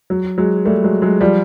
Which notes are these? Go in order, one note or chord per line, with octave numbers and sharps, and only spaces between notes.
F#3
F#3 G#3
G3 A3
F#3 G#3
F#3 G#3
F3 G3